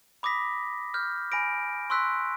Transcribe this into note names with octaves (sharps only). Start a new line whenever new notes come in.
B5 D6 D#6 A#6 B6
F6 G6
G#5 B5 A#6 D7
C6 C#6 E6 F#6 B6